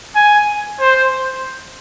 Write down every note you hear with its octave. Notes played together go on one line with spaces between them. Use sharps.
G#5
C5